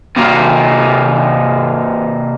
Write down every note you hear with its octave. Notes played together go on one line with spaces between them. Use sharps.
C3 A#3